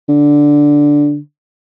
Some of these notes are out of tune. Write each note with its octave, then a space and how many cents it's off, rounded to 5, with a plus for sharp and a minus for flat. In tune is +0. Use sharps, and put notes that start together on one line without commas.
D3 -5